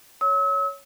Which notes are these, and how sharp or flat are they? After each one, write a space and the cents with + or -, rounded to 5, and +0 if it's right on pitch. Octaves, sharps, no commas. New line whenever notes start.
C#5 +10 E6 -40